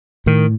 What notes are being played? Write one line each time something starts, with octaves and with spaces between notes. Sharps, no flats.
A2 D#3